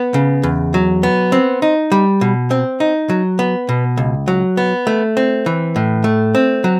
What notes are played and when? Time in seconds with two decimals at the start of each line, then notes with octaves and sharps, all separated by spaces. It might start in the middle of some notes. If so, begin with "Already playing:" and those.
Already playing: B3
0.14 C#3
0.43 E2
0.74 F#3
1.03 B3
1.32 C4
1.62 D#4
1.92 G3
2.21 B2
2.51 C4
2.80 D#4
3.09 F#3
3.39 B3
3.69 B2
3.97 C#2
4.28 F#3
4.57 B3
4.87 A3
5.17 C4
5.46 E3
5.76 A2
6.04 A3
6.35 C4
6.64 F#3